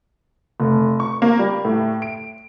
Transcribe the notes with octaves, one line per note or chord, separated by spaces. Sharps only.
F1
C#6
A#3
G3
A2
D7